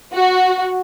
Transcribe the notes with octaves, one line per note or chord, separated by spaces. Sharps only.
F#4